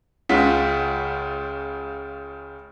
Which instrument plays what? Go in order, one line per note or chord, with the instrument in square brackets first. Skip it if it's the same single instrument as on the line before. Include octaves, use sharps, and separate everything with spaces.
[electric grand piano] C#2 C#3 F4 F#5 B6